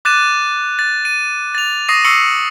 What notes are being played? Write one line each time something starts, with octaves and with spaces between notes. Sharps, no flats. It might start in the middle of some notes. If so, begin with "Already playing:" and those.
D6 F#6 A6 D#7 E7
A6
D#7
A6 F7
C#6 D#6 A#6 C7 D#7
C#6 D#6 E6 C7 C#7 F#7